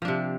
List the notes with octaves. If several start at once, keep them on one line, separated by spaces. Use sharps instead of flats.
C3 F3 D4